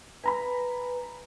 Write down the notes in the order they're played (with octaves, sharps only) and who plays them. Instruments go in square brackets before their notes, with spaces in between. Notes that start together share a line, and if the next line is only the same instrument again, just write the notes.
[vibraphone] B4 [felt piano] G#5 A#5 B5